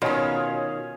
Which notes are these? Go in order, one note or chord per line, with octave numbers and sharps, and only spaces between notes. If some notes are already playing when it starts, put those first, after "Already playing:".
B2 D#3 C#4 F4 G#4 C#5